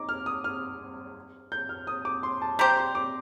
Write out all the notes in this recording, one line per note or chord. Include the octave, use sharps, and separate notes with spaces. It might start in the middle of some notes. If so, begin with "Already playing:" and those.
Already playing: D#4 D6
F6
D#6
F6
G6
F6
D#6
D6
C6
A5
G3 C4 G4 C5 A#5
C6
D6